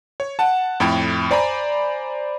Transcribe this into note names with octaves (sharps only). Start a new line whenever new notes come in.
C#5
F#5 A5
F2 A2 G5 B5 G#6 C#7
C5 D5 G#5 A#5 B5